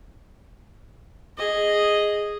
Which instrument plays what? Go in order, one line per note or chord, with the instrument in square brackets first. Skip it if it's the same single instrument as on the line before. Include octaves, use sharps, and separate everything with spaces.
[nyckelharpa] G#4 D#5